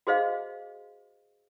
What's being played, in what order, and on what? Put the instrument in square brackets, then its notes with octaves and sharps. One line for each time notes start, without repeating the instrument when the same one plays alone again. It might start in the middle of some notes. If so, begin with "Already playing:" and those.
[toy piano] F#4 G#4 C5 D#5 F5